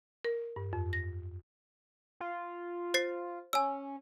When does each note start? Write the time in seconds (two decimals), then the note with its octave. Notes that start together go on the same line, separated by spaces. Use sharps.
0.25 A#4
0.56 G2
0.73 F2
0.93 A#6
2.20 F4
2.94 C5 A6 C7
3.53 C#4 G#5 E6